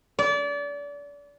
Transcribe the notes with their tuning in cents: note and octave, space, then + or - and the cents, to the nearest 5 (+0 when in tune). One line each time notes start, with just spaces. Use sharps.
D5 -30